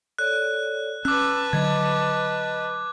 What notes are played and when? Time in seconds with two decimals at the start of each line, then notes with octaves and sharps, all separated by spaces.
0.19 A4 C#5 D5 F#6
1.05 C#4 B4 A5 D6 E6 F#6
1.53 D3 F#3 D#5 G#6